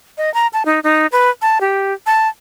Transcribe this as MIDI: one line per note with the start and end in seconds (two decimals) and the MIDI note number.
0.18 0.32 75
0.34 0.47 82
0.53 0.63 81
0.65 0.80 63
0.84 1.07 63
1.12 1.30 71
1.42 1.59 81
1.61 1.94 67
2.06 2.28 81